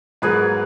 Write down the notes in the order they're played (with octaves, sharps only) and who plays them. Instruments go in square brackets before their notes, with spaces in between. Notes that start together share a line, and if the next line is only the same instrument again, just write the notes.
[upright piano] G#2 F#3 A#3 [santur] G#4 B4